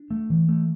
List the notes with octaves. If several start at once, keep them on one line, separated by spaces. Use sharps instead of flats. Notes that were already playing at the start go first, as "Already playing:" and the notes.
Already playing: D4
A3
E3
A3